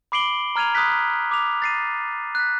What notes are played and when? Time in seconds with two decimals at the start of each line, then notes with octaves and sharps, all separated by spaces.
0.12 B5 D6 C7 D7 F#7 G7
0.56 A#5 F6 G#6 D#7 F7
0.75 B5 D#6 F6 F#6 B6
1.31 D6 F7
1.62 A6 C7 D#7
2.35 F#6 B6